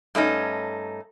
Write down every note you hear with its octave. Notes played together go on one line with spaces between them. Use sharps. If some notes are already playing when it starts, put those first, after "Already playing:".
G2 A3 C#4 D#4